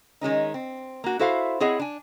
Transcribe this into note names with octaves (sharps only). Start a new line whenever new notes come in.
D#3 G#3 C#4 D#4
C4
A#3 F#4
E4 F#4 A4 C5 E5 F5
C4 E4 G#4 C#5 D#5 F#5
D4 G#5